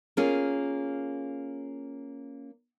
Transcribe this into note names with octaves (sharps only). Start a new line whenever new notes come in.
A#3 C#4 F4 G#4